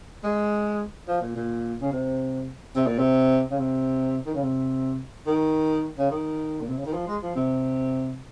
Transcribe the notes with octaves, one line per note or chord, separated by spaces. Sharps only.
G#3
F3
A#2
A#2
C#3
C3
C3
A#2
C3
C#3
C3
D#3
C#3
C3
D#3
C#3
D#3
A#2
C3
C#3
D#3
F3
G#3
F3
C3